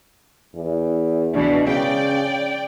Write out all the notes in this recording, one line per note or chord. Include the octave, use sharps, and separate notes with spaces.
E2
C#2 B2 E3 D4
C#3 D5 G5